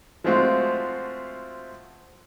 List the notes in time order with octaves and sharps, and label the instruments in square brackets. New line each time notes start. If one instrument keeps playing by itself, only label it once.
[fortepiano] F3 G#3 A3 C4 F4 F#4